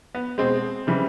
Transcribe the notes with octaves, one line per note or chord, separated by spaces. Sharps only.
B3
B2 G#3 C4
C#3 E3 G3